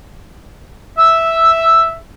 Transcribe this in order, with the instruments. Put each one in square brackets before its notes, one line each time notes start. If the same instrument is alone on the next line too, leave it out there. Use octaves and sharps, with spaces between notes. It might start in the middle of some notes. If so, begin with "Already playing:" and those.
[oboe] E5 [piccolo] E6